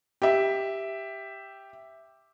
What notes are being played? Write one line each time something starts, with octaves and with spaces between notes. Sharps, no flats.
G4 E5